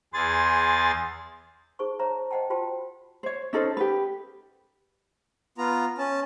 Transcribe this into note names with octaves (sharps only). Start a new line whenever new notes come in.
E2 G#4 C6 A6
D#4 G#4 C5 C#6
C5 C#5 E5 A5 A#5
C5 D#5 F#5 G5 A5
F4 F#4 C5 G5 A5
C5 C#5
C#4 D#4 A4 C5
G4 B4
B3 F4 A#5
C#4 A5